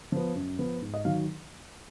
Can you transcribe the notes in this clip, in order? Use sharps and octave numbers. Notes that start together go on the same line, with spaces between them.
F3 B3
F#2
F3 B3
G#2
D#5
D#3 F#3 F5